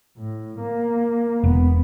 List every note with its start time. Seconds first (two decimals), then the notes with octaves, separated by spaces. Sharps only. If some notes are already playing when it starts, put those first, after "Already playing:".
0.17 A2
0.60 A#3
1.44 E1 B3